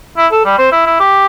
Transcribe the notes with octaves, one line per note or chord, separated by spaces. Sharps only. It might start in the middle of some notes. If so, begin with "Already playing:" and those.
E4
A4
G3
C4
E4
E4
G4